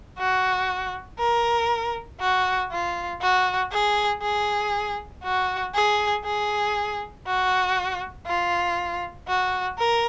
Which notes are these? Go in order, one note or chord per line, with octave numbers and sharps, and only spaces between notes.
F#4
A#4
F#4
F4
F#4
G#4
G#4
F#4
G#4
G#4
F#4
F4
F#4
A#4